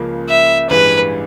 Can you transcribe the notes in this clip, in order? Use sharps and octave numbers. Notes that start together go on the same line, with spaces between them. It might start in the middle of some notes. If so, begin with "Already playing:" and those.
Already playing: C#2 C#3 F3 A#3
E5
A1 G2 E3 G#3 B4